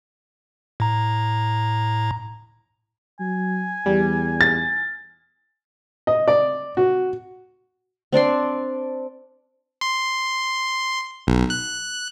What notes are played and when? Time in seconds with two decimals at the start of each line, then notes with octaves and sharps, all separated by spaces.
0.80 A2 A#5
3.20 F#3 G#5
3.86 E2 G3
4.41 A6
6.07 D#5
6.28 D5
6.77 F#4
8.12 C4 D4 D5 C6
9.81 C6
11.27 B1
11.50 F#6